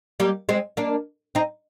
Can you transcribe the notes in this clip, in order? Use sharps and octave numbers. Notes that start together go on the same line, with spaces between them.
G3 A#3
G#3 C4
A#3 D4
C4 D#4